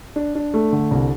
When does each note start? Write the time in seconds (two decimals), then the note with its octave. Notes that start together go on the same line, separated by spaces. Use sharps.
0.16 D4
0.35 D4
0.54 A3
0.73 D3
0.91 C2